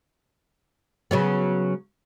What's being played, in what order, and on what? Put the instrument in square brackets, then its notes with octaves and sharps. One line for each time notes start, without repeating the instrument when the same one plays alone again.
[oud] C#3 F#3 B3